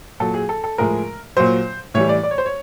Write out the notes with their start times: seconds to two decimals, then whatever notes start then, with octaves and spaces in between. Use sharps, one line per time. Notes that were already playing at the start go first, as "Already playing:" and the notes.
0.20 A#2 F#3 A4
0.34 G#4
0.49 A4
0.64 A4
0.78 A2 F3 G#3 A#4
1.37 A#2 F#3 C5
1.94 A2 E3 G3 C#5
2.09 D5
2.23 D5
2.31 C#5
2.38 C5
2.46 C#5